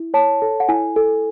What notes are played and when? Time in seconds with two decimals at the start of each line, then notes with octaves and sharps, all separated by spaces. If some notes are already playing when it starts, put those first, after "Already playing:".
Already playing: E4
0.14 C#5 A5
0.42 A4
0.60 F#5
0.69 E4 G#5
0.96 A4